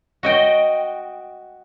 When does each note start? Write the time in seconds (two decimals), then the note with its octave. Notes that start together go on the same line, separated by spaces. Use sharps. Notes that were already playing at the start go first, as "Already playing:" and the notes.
0.23 F#4 D#5 G5